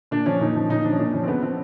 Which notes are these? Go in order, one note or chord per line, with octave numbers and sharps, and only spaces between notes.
A#2 D4
F3 C#4
A#2 D#4
F3
A#2 D#4
F3 D4
C#4
A#2 D4
F3 C#4
C4
C#3 B3
F3 C4